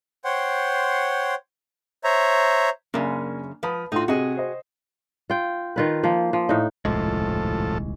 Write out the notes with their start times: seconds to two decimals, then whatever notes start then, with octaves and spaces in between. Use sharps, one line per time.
0.25 C5 C#5 F#5 G5 C6
2.04 C5 C#5 E5 A#5
2.94 F#2 C#3 A#3 D4 G#5
3.63 F3 B4 B5 D#6
3.92 A2 D#4 F4 F#4 C6
4.08 C3 F#4 G#4 D#5
4.37 C5 D#5
5.30 F4 G5
5.76 D#3 F4 B4
6.03 F3 A#3
6.33 F3
6.49 A2 D#4
6.85 D#1 C2 A2 F3 G#3 A4